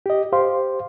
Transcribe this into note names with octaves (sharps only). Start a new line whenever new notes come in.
G4 D#5
G4 C5 F5 C6